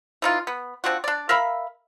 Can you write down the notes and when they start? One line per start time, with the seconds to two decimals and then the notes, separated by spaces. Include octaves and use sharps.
0.22 E3 D#4 F4
0.47 B3
0.84 C4 D4 F4 F#4
1.04 D4 D5
1.29 A#4 E5 F5 B5